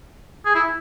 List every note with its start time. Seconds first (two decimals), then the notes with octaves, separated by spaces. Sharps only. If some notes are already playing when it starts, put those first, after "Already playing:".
0.46 G#4
0.55 E4